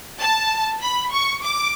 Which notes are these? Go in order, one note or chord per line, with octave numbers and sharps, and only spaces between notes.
A5
B5
C#6
D6